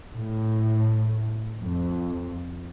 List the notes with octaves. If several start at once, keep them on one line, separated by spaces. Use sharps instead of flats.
A2
F2